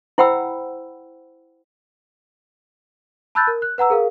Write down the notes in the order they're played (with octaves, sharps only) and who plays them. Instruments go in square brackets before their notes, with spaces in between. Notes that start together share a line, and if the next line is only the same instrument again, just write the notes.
[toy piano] E4 C5 F#5 G5 B5 E6
[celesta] A5 B5 E6 F#6 G6 A6
A#4
F#6
B4 F#5 A#5 E6
G#4 A#4 F5